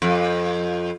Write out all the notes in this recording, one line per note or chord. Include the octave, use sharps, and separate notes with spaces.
F2